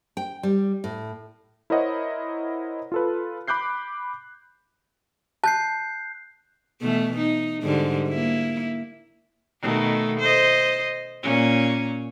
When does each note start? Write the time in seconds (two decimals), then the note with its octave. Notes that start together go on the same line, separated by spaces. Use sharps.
0.17 G5
0.43 G3
0.84 A2
1.70 E4 A#4 C5 C#5 D#5 F#5
2.92 F4 A4 B4
3.48 B5 D6 F#6 G6 C7
5.44 A5 F#6 G6 C7
6.81 B2 E3 A3
7.18 D#4
7.63 G#2 D3 G3
8.09 A#3 E4
9.61 B2 D#3 A3
10.20 C5 D#5
11.23 A#2 C#4